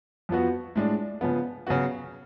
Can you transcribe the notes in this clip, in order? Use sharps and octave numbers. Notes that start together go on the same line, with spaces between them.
F2 F3 B3 F#4
A2 G#3 D4
C#3 F3 B3
C#3 F#3 B3 F#4